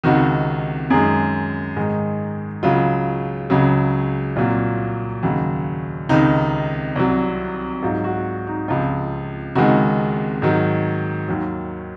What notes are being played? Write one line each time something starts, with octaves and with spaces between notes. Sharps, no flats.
C#2 C3 D#3 F#4
F#2 D#3 G#3 G#4
G#2 D#3 G#3
C#2 C#3 F#3 F4
C#2 C#3 F#3
C2 A#2 F#3 F4
D#2 C#3 F#3
C#2 C3 D#3 D#4
C2 C3 F#3
G#2 F#3 F4
F#4
D#4
C#2 C3 F3 F4
C#2 C3 D#3 G#3 F#4
G#2 D#3 F#3
D#2 D#3 F#3